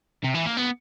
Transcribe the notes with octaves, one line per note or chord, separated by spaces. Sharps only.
C3
E3
A#3
B3